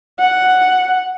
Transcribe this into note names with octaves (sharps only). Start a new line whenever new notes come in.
F#5